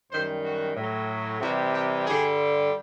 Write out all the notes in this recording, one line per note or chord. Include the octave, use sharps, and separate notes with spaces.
F#2 D#3 G3 C5
F#4
A2 F#3
C3 E3 G3 F#4
G4
G2 D3 G3 G#4